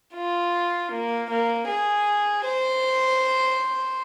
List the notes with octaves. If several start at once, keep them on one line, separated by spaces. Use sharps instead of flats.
F4
A#3
A#3
G#4
C5